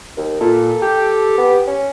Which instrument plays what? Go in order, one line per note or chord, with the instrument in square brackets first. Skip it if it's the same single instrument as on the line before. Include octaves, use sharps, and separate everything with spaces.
[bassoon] D#2
[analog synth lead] A#2 [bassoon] A4
[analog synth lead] G4
[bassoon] B3
C#4